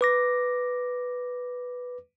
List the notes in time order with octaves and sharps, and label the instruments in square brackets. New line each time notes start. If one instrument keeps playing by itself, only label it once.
[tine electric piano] B4 D6 A#6